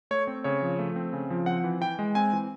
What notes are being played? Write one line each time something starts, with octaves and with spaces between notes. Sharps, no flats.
A3 C#5
C4
C#3 C#5
F3
A3
C4
C#3
F3
C4 F#5
E3
E3 G5
G#3
C4 G#5
E3